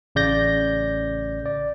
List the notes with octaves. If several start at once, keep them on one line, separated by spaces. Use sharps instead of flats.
A1 C#3 D5 G6 A#6
D5